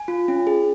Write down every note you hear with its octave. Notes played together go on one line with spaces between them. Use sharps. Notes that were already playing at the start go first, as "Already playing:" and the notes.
Already playing: G#5
F4
C#4
G#4